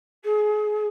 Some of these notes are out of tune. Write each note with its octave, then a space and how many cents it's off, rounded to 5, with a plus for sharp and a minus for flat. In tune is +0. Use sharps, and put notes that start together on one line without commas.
G#4 +25